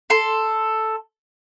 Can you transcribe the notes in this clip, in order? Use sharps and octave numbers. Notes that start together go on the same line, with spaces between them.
A4 C6